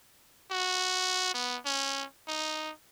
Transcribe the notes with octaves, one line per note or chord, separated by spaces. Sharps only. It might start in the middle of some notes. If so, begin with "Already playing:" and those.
F#4
B3
C#4
D#4